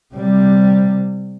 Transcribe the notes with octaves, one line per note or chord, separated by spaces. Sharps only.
C3 G3